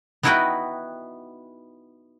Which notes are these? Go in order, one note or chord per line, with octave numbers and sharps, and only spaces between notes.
B3 D#4 E4 F#4 B4 G5